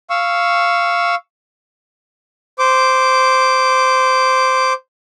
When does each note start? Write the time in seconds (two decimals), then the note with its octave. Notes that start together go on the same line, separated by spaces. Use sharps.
0.10 F5 C#6 E6
2.59 C5 D6